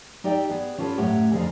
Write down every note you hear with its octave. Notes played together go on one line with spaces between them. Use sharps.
D#4 G4 D5 E5 G5
B3 G#4
C#4 F4 G4 A4 B4
F#2 A2 A3 G4 C#5 F#5
F2 D3 G#4 A#4 F5